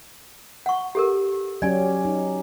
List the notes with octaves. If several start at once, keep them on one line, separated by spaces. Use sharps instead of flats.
F#5 C#6
G4 A4 A#4
F#3 C#4 G4 D5 G#5
D#4